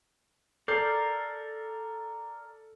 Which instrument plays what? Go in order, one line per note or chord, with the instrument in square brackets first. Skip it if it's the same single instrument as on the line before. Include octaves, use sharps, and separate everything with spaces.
[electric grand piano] A4 G6 C7 [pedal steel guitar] A#4 D5